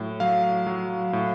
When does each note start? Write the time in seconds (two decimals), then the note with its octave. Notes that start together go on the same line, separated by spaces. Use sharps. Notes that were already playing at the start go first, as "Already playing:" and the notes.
Already playing: A2 F#3
0.20 F#3 F5
0.67 F#3
1.13 A2